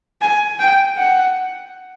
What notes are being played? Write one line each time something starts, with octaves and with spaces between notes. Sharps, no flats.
G#5
G5
F#5